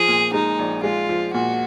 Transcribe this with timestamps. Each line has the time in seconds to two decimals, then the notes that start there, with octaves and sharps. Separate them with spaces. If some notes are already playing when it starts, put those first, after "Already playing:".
Already playing: F3 G#4
0.08 A#2
0.34 G#3 D#4
0.59 A#1
0.84 G#3 F4
1.09 F3
1.34 A#2 F#4